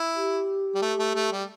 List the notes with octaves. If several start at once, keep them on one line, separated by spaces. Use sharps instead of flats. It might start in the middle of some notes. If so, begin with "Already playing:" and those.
Already playing: E4
G4
G3
A3
A3
A3
G3